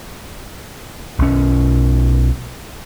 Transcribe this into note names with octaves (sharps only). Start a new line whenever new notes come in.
B1 C#4